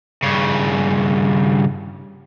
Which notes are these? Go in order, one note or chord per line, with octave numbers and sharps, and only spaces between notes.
G2 C#3